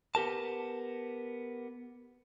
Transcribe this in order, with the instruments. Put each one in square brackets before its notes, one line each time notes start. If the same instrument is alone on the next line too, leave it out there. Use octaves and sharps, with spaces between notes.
[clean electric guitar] B3 G4 A#4 A5